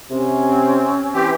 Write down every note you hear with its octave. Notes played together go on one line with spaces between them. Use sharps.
C3 C#4
C4
E3 C4 G4